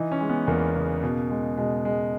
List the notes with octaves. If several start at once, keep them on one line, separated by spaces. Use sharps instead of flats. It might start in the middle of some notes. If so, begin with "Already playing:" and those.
Already playing: E3 D#4
C#4
G#3
B3
E2 A#3
C#3
B2
G#3
B2 G#3
G#3